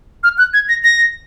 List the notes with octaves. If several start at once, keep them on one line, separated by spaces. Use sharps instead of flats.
F6
F#6
G#6
A#6
A#6